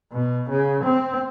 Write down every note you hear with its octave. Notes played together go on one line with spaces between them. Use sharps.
B2
C#3
C4